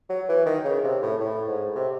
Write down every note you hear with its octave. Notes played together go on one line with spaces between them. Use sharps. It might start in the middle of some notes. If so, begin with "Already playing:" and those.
F#3
E3
D#3
C#3
C3
A2
A2
G#2
C3